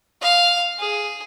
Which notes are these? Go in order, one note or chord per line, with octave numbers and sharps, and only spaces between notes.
F5
G#4